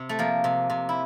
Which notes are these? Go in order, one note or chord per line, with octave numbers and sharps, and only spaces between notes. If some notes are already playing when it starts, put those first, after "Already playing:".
Already playing: C3
A3
F3 A#3
C3
C3
E4